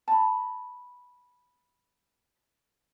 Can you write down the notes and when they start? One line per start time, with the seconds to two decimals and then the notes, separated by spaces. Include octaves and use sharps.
0.08 A5 B5